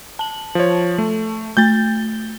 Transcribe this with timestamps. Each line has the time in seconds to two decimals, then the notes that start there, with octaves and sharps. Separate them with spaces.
0.19 A5 F#7
0.55 F3 C#5
0.98 A3
1.57 A3 G6 A6 G7